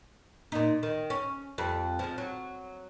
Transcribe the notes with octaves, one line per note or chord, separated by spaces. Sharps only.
A#2 D#4
D#3
C#4
F2 G3
F3 G#3
F#3